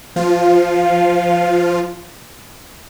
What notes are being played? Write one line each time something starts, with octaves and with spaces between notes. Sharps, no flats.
F3 F4